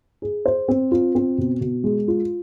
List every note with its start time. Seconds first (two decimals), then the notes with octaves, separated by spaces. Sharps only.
0.22 G#4
0.46 C5
0.68 C4
0.92 F4
1.15 C4
1.38 B2
1.61 B2
1.84 G#3
2.08 F4